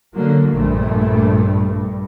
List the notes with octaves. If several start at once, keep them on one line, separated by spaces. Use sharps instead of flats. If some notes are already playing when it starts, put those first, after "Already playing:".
D3 F#3 A#3
A#1 G2 A3
G2